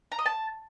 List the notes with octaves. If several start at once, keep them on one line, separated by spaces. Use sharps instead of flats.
A#5
D#5
A5